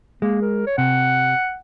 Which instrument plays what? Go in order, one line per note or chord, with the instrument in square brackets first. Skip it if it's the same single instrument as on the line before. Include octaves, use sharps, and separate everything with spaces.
[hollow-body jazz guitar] G#3 [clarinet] A#3
[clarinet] A#4
C#5
[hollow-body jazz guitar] C3 [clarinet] F#5